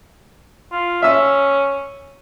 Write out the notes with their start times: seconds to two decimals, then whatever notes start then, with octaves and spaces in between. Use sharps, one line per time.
0.71 F4
1.02 C#4 E5 E6